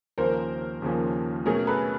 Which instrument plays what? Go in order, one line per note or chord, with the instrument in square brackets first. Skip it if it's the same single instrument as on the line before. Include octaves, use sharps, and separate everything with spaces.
[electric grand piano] D#2 C#3 F3 A#3 C#4 [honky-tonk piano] A#4 C5
[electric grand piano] D#2 C#3 F3 A#3 C#4
[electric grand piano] B2 F#3 A3 C#4 [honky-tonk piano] G#4 A#4
[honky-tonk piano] A4 B4